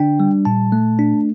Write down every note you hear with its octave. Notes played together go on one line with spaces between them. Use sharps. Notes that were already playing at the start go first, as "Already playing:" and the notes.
Already playing: D3 D4 G5
G3
A#2 A5
A3
D4